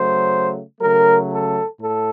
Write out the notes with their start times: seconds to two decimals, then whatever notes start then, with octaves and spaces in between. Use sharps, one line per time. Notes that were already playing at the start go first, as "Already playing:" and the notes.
Already playing: C#3 F#3 A3 C5
0.80 C#3 F#3 A3 A#4
1.30 A4
1.80 A2 A4